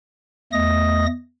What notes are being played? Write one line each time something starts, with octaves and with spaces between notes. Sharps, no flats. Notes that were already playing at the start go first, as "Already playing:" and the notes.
E2 A3 D#5 D#6 A#6